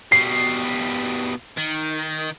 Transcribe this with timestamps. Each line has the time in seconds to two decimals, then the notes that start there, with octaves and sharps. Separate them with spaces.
0.12 B2 G3 C7
1.58 D#3